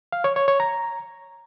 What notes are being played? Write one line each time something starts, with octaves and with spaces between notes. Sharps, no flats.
F5
C#5
C#5
C#5
A#5